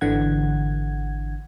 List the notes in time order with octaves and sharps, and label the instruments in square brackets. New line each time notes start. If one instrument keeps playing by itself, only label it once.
[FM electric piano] G#1 D3 E3 F#5 G#6